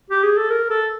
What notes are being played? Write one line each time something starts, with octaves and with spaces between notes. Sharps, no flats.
G4
G#4
A4
A#4
A4